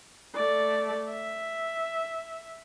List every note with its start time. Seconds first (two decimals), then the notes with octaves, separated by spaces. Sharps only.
0.35 A3 D5
1.09 E5